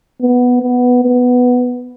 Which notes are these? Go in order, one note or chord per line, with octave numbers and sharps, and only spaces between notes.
B3
B3
B3